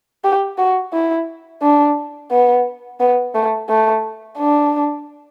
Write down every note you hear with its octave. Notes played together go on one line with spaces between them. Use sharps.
G4
F#4
E4
D4
B3
B3
A3
A3
D4